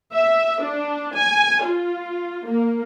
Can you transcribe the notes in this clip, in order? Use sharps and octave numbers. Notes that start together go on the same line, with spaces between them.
E5
D4
G#5
F4
A#3